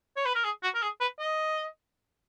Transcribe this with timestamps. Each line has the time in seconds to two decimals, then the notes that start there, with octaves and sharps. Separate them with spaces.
0.17 C#5
0.25 B4
0.35 A#4
0.44 G#4
0.63 F#4
0.75 A#4
0.82 G#4
1.00 B4
1.19 D#5